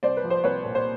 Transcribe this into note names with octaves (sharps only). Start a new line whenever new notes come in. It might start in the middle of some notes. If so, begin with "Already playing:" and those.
C2 C5 D5
B4
F3
C5
C2 B4 C#5
A#2
C5